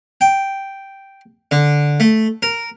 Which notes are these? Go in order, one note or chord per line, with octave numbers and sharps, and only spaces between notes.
G5
D3
A3
A#4